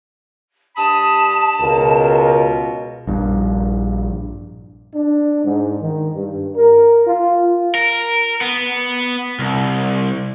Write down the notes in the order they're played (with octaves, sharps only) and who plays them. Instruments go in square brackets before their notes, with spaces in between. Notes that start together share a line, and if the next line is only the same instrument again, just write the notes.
[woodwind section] G2 B5 D#6 [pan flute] A5
[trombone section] C#2 F4 A#4 [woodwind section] B2
[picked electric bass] A#1 G2
[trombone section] D4
G#2
D#3
G2
A#4
F4
[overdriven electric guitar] A#4
B3
C2